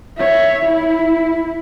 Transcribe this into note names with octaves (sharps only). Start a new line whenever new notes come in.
C#5 E5
E4